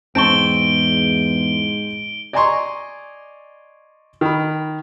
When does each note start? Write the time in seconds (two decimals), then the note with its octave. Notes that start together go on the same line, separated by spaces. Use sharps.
0.15 E2 G#2 C4 A5 C#6 D7 G7
2.33 D5 D#5 G#5 A#5 C6 C#6
4.21 D#3 B5